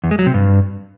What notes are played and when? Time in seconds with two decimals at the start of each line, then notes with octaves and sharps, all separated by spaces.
0.04 E2
0.11 G#3
0.19 F#3
0.26 C3
0.34 G2